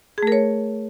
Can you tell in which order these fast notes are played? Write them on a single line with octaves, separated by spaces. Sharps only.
G#4 A3 A#4 C#5